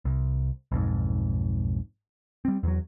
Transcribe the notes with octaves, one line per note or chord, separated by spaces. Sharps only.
C2
B1 F2 G#2
G3 C4
E2 F#3